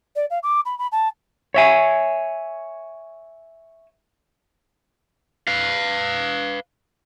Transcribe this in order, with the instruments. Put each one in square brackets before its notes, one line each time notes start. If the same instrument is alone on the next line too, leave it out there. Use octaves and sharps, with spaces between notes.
[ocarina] D5
F5
D6
B5
B5
A5
[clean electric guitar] C#5 E5 G#5
[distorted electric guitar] B4 F5